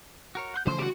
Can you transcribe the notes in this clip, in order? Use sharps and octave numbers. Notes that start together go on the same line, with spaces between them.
F#4 A#4 C#5
F#5 C6 G6
C#3 E3 F3 A3 C5 C6
G3 F#4 G4 D5